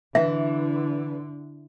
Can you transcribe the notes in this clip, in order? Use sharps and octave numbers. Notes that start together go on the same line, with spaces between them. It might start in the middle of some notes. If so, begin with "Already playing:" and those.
D3 E3 E5